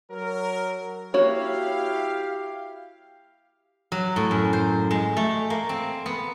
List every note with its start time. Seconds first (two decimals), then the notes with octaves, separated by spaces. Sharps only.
0.12 F#3 A#4
1.14 A#3 E4 F#4 G4 C#5 F5
3.92 F#3
4.16 A2
4.31 F#2
4.53 C5
4.91 G#3
5.17 A3
5.50 A#3
5.69 C4
6.06 B3